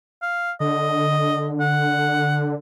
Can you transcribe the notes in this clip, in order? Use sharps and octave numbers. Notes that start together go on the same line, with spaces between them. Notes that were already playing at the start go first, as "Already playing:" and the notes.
F5
D3 D#5
F#5